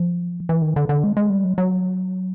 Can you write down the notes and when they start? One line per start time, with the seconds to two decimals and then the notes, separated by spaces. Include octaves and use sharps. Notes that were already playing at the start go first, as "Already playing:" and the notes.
Already playing: F3
0.49 E3
0.62 D#3
0.76 D3
0.89 D3
1.04 G#3
1.17 G#3
1.30 G3
1.43 F#3
1.58 F#3